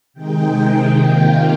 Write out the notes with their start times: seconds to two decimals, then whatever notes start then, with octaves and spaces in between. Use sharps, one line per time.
0.14 C3 D#3 G#3 D#4 G5
0.96 C3 D#3 A#3 F4